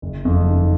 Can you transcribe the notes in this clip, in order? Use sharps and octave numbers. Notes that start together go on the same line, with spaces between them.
F#1
F2
D#3